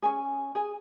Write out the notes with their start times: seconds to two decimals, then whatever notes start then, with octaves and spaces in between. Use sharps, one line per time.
0.02 C#4 G#4 G#5
0.55 G#4 G#5